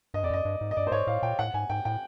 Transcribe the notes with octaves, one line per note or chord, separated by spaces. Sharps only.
G2 D#5
F2 D5
F#2 D#5
G2
G#2
D#5
G2 D5
C5
G#2 C#5
A2 F5
A#2 G5
A2 F#5
G#2 G#5
G#2 G5
A2 G5